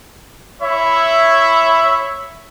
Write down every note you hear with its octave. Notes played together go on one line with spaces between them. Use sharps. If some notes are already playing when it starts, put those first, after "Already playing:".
E4 C#5 E5